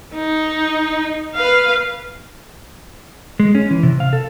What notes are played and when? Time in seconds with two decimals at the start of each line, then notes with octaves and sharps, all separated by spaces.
0.14 D#4
1.35 B4 F5
3.40 G#3
3.55 C#4
3.71 E3
3.83 C3
4.00 F5
4.13 A4